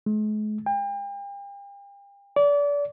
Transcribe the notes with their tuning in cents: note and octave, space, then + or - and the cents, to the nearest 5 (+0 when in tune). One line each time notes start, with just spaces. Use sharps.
G#3 +45
G5 +40
D5 -30